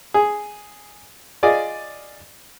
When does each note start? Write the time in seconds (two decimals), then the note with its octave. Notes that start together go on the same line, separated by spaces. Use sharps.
0.14 G#4
1.43 F4 G#4 D5 D#5